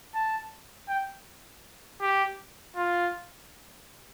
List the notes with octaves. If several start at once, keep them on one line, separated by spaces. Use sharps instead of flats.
A5
G5
G4
F4